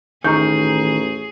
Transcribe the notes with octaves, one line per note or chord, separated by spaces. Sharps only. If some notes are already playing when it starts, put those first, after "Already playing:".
A1 D#3 G#4 A#5 C#6 G6